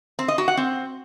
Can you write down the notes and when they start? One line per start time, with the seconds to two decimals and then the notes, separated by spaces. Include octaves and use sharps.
0.19 C4
0.28 D#5
0.38 F#4
0.48 F#5
0.57 C4